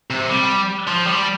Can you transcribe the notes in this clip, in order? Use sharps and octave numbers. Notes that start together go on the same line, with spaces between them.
C3
G3
F3
G3